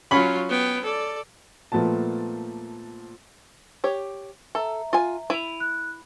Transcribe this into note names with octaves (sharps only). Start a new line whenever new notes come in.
F#3 C#4 F4 B5
B3 G5
A4 D5
A#2 F3 A3 B3 A5
G4 C#5
A4 E5 A#5
F4 G#5
E4 D#7 F7
F#6